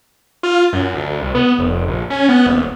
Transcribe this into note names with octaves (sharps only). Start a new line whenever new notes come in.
F4
F#2
D2
D2
C2
B3
F1
A#1
C#4
B3
D#1